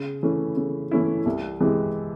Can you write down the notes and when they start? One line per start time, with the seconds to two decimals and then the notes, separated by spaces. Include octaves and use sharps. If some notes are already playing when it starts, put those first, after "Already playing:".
Already playing: C#3
0.23 E3 A3 C#4 E4
0.57 C#3
0.91 E3 A3 C#4 E4
1.26 C2
1.60 C3 E3 G#3